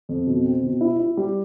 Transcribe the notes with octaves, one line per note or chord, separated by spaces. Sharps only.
F2
B2
C4
B2
E4
E4
G3